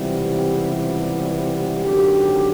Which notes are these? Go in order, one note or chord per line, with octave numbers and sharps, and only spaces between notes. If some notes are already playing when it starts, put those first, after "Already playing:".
Already playing: C#2 C3 E3 G3 B3
G4
G#1 F#2 D3 G4